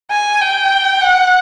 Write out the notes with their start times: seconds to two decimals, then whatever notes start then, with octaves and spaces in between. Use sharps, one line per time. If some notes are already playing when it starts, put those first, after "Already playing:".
0.11 G#5
0.41 G5
1.00 F#5